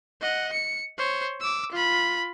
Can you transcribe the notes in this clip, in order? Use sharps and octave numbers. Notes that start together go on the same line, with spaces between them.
D#5 F#5
C#7
C5 C#5
D6 E6
F4 B5